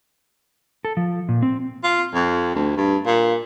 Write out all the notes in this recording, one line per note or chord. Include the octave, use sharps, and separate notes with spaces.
A4
F3
A#2
C4
F4
F2
D2
G2
A#2